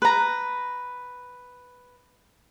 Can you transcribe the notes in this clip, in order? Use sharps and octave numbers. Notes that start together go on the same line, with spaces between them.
B4 A#5